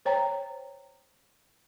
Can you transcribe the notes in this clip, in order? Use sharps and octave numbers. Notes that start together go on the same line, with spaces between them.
C5 C#5 G5 A#5